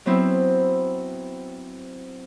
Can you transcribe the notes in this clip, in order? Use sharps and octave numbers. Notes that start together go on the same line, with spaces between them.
F#3 B3 C4 E4